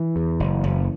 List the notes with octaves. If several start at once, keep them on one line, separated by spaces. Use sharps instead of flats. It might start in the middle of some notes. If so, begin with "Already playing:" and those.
Already playing: E3
E2
F#1
F#1